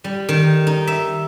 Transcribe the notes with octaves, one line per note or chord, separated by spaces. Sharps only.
G3
D#3
D#4
E5